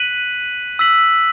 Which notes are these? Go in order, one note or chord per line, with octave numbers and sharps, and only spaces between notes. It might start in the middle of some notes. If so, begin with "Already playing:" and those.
Already playing: F#6 B6 D#7 F#7
E6 B6 F#7